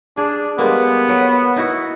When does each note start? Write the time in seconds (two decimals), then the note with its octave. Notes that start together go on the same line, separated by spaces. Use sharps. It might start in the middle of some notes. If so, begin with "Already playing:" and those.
0.17 D4 G#4
0.59 G3 G#3 A#3 B3
1.09 F#3
1.56 D#4 E4 F#4